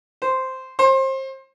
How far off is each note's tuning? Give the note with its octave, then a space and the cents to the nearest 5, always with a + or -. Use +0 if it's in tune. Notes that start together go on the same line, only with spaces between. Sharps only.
C5 -5
C5 +30